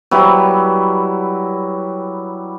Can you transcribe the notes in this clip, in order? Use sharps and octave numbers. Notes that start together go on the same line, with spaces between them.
F#3 G3 E4 B4